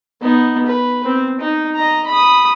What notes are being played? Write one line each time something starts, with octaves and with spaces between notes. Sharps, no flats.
B3 D#4
B4
C4
D#4
D#5 A#5
B5 D#6